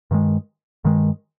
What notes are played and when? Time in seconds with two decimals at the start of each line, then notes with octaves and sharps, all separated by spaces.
0.11 G2 D#3 G#3
0.84 G2 D#3 G#3